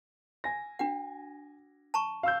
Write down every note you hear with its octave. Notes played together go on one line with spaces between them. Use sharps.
G#5 A#6
D4 F#4 F#5
A5 A#5 C#6
F5 E6 G6